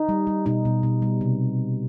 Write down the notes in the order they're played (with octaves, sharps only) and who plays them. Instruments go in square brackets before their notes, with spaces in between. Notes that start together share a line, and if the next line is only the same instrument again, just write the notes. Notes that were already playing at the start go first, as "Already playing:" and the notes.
Already playing: [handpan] D#4
G3
G3
B2 D#4
B2
B2
G3
C3